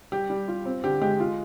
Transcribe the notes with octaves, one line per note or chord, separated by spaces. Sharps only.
G3 G4
G3
F4
C4
D3 G4
G#3 G4
F4